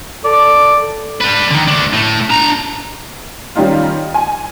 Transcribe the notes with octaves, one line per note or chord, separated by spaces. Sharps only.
A4 D5
D4 B4
D3 D#3
A3 D4
A2 A3
D4 A#5
D#3 G3 C#4 D#4 F4
G#5